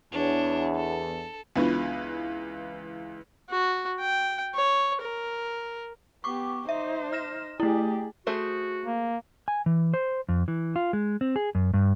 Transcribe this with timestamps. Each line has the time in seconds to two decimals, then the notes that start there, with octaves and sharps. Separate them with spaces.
0.12 E2 D4 C#5
0.76 A4
1.56 C#2 E3 B3 D4 F4 B4
3.49 F#4
4.00 G5
4.55 C#5
5.02 A#4
6.24 B3 G4 C#6 D6
6.69 D#4 C5 E5
7.13 F6 A#6 E7
7.60 A3 E4 G4 G#4
8.27 A3 F#4 G#4 C5
8.85 A#3
9.48 G#5
9.66 E3
9.94 C5
10.29 F2
10.48 E3
10.76 F4
10.93 G#3
11.21 C4
11.36 G#4
11.55 F#2
11.74 G2